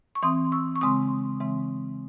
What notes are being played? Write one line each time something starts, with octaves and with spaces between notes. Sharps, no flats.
C#6
E3 C4 C6 D#6
C#6 E6
C#6
C#3 G#3 C4 C6 D#6
C#3 E3 G#3 C4